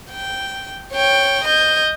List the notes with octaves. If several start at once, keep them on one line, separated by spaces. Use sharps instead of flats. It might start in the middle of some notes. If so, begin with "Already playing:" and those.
G5
C#5 G5
D#5 G6